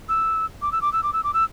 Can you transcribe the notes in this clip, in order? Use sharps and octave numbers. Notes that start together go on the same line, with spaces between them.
E6
D6
E6
D6
E6
D6
E6
D6
E6